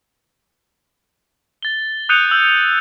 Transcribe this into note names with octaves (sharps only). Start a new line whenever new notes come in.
A6 G7
D#6 F#6 G6 C#7 D#7 F7
E6 G6